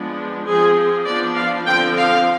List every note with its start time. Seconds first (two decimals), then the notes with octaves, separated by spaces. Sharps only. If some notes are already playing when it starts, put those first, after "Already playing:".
Already playing: F3 G#3 B3 D4
0.45 F3 C4 G#4
1.06 F3 B3 D4 D5
1.36 F5
1.66 D3 F3 C4 G5
1.96 F5